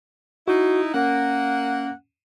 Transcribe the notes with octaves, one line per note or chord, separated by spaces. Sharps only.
D#4 E4 F#4
A#3 C#4 F#5